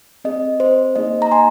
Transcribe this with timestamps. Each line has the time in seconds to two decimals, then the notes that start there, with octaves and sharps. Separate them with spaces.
0.24 C4 G#4 D#5
0.60 C5
0.96 A#3 D#4 G#4 D#5
1.22 A#5
1.31 G#5 C6